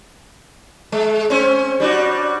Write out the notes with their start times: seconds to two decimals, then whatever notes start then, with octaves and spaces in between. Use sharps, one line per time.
0.92 G#3
1.30 C4 C#4
1.80 G3 D4 F#4